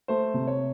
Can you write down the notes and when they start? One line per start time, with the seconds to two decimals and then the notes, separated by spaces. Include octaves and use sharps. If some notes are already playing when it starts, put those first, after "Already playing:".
0.08 A3 C5
0.34 C3
0.47 C#5